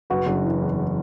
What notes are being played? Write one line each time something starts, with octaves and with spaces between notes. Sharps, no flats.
F#1 F#4 B4
F#1
E3
E2